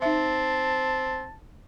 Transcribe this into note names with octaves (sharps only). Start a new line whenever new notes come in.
C4 D#4 E5 A5